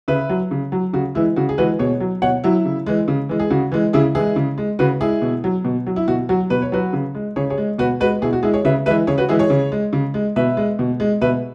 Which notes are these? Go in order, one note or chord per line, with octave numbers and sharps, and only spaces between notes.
C#3 B4 E5
F#3
C#3
F#3
C#3 F#4
E3 G#3 E4
C#3 F#4
G#4
E3 G#3 F#4 B4
B2 G#4 C#5
F#3
B2 C#5 F#5
F#3 E4
C#3
E3 G#3
C#3
E3 G#3
G#4
C#3 F#4
E3 G#3
C#3 E4 G#4
E3 G#3 E4 G#4
C#3
G#3
C#3 F#4 B4
G#3 E4 G#4
B2
F#3
B2
F#3
E4
B2 F#4
F#3 F#4
B2 B4
C#5
F#3 F#4 B4
C#3
G#3
C#3 G#4 C#5
G#4 C#5
G#3
B2 F#4 B4
G#3 F#4 B4
B2 E4 G#4
F#4
G#3 E4 G#4
G#4 C#5
C#3 B4 E5
E3 G#3 B4 E5
C#3 G#4 C#5
F#4 B4
E3 G#3 E4 G#4
G#4 C#5
C#3
G#3
C#3
G#3
B2 B4 E5
G#3
B2
G#3
B2 B4 E5